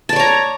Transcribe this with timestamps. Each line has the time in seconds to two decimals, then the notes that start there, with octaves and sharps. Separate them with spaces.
0.09 A5
0.13 D5
0.16 C#5
0.20 A#5